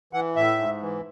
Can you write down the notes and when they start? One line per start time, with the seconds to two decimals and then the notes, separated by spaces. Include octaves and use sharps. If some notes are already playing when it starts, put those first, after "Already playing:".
0.13 E3 F#5
0.36 A2 E5
0.58 G#2
0.82 E3